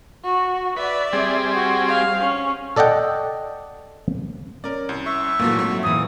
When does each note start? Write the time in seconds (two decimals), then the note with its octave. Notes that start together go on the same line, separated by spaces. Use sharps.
0.24 F#4
0.77 B4 D5 E5
1.13 G3 C4 G#4
1.56 F#4
1.88 F5
2.20 C#4
2.76 A4 D5 D#5 F#5 G5
4.64 C#4 A#4 D5
4.89 C2
5.06 E5 C#6
5.39 A#2 E3 F#3 A3 A#3
5.57 G#2 F#3 C4
5.83 E2 A#2 E3 D#6